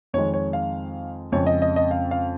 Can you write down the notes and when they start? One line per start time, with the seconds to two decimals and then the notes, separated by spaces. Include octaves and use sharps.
0.14 F2 D#3 G#3 C#5
0.34 C#5
0.53 F5
1.32 F2 C#3 G#3 C#5
1.47 D#5
1.62 D#5
1.76 D#5
1.91 F5
2.11 F5